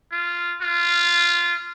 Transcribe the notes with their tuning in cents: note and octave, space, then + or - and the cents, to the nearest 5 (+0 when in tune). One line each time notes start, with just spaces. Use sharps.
F4 -10
F4 -15